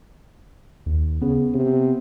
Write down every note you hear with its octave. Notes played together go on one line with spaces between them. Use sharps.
D#2
C#3 B3
C3